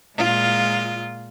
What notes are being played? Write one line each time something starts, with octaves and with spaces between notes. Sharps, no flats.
A#2 G#3 F4